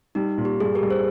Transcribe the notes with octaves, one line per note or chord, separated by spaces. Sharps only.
G3 D#4
A#2
G4
G2 G#4
G4 A#4
G2
G#4 C5